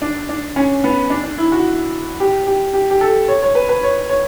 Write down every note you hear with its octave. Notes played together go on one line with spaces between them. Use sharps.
D4
D4
C#4
B3
D4
D4
E4
F#4
G4
G4
G4
G4
A4
C#5
C#5
B4
B4
C#5
C#5